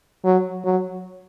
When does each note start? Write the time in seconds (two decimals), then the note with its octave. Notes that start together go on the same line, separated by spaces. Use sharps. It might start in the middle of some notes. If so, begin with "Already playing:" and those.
0.25 F#3
0.65 F#3